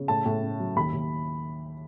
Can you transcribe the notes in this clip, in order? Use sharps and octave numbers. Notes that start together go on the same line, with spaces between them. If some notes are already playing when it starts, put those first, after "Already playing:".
Already playing: C#3
A2 A5
A2
C#4
F#3
D#2 B5
D#2